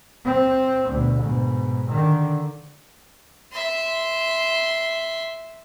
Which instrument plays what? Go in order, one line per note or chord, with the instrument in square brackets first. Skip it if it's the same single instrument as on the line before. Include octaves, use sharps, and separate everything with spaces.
[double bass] C4
D2 B2
G#2 B2
D3 D#3
[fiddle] E5 C6